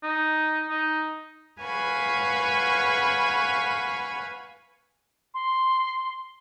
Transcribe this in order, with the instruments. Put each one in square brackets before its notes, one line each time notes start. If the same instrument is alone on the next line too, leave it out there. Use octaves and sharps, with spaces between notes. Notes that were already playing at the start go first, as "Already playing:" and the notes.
[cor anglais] D#4
D#4
[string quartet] B4 F5 F#5 G#5 B5 C#6
[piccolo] C6